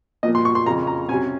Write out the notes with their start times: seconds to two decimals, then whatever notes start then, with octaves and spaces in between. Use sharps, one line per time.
0.23 A#2 F3 A#3 D#5
0.35 C6
0.45 C#6
0.55 C6
0.66 F2 C#3 F3 A#5
0.87 A#5
1.09 C3 F#3 C#4 G#5